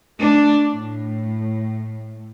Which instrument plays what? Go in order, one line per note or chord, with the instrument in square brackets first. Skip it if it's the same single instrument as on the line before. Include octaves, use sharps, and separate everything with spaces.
[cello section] A3 D4
A2